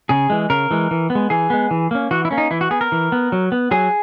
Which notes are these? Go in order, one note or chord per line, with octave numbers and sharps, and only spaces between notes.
C#3 G#4
E3 G#3
C#3 A#4
E3 G#3
E3
B3
G#3
E3 G#4
G#3 B3
E3
A#3 C#4
E3 F#4
E4
A#3 C#4
D#4
E3 E4
F#4
B3 G#4
A#4
E3
B3
F#3
B3
F#3 G#4